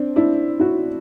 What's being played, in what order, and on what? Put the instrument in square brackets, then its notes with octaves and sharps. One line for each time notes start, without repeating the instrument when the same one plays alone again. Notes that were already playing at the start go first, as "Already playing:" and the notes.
Already playing: [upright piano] C4 D4
D4 E4
E4 F#4